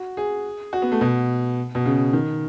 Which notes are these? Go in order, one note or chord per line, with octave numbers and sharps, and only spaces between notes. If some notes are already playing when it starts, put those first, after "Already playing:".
Already playing: F#4
G#4
F#4
B3
A3
B2
B2
C#3
D#3